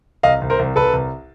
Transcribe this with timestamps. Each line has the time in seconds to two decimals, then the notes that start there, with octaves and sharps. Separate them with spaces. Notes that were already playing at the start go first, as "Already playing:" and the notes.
0.23 C2 D#5 F5
0.42 C2
0.50 A#4 C5
0.59 C2
0.76 C2 A4 B4
0.93 C2